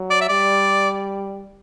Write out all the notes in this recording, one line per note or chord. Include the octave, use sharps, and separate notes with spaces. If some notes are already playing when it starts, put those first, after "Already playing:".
Already playing: F#3
D5
E5
G3 D5